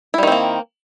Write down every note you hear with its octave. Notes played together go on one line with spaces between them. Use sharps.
D#3 G3 A#3 C4 E4